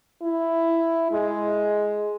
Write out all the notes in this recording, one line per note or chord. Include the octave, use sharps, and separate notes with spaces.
E4
G#3